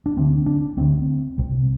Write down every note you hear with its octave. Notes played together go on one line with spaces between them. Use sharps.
D4
D2 D3 C4
D4
D2 D3 C4
C2 C3